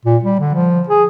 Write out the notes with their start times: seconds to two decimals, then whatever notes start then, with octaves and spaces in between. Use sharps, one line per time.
0.05 A#2
0.24 G3
0.39 D3
0.54 F3
0.89 G#4